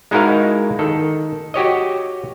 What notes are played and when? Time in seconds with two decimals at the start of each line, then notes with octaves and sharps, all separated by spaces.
0.11 G#3 D#4 E4 F#4 A#4 F5
0.79 D#3 A4
1.54 F#4 G4 C#5 D#5